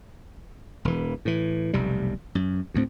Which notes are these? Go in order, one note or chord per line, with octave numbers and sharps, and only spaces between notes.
E1 E3
A2 E3
F1 B1 C3 G3
F#2
D2 A2 C4